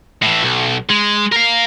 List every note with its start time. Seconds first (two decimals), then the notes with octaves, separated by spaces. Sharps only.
0.22 A2 E3
0.43 B1
0.89 G#3
1.32 A#4 F5